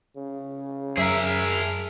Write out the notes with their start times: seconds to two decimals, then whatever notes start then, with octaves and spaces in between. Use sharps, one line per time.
0.17 C#3
0.97 F#2 G#4 A#4 E5